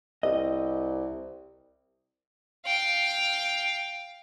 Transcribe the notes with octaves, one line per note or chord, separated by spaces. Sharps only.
C2 D#5
F5 G5